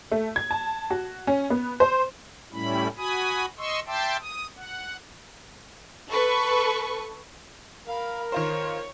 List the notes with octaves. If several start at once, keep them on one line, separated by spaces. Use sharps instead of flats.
A3
G#6
A5
F#4
C#4
B3
C5
A2 G3 A3 C#4 E4 B5
F#4 G#5 B5 D#6
D#5 C6 C#6 E6
E5 G5 A5 C6 D6 E6
D#6
F#5
A4 B4 C#6
A#4 F5 B5
D#3 F4 C5 C#5